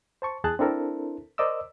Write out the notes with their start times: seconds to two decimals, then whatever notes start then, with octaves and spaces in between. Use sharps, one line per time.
0.22 C5 A5 C#6
0.44 E2 G#4 A5 F#6
0.59 C4 D4 E4 A4 A#4 C5
1.38 A#4 C5 D5 D#5 D6 E6